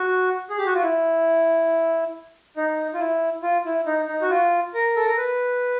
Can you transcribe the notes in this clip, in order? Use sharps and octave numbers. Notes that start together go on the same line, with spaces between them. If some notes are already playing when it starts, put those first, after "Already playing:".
Already playing: F#4
G#4
G4
F#4
F4
E4
D#4
F4
E4
F4
E4
D#4
D#4
F#4
F4
A#4
A4
A#4
B4